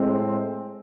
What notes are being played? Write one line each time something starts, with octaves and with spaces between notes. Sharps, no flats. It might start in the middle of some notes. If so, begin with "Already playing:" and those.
Already playing: A2 G#3 C4